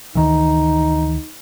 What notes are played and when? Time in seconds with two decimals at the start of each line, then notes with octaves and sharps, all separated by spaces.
0.15 D2 D#3 E3 D#4